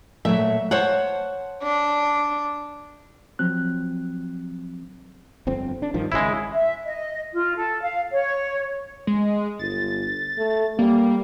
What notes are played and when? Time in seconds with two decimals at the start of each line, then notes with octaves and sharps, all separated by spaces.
0.25 A#2 F#3 A3 E5
0.71 C5 C#5 F#5 A5
1.62 D4
3.39 F3 F#3 C4 F#6
5.47 G1 F2 C4
5.82 D4
5.94 G2 D#3 F3
6.12 G#1 C#3 G#3 E4
6.53 E5
6.85 D#5
7.33 F4
7.56 A4
7.81 F5
8.11 C#5
9.07 G#3
9.59 G1 A6
10.38 A3
10.79 G3 A#3